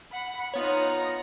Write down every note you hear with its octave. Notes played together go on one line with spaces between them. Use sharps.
F#5 B5
B3 D#4 F4 C#5 F#5 A#5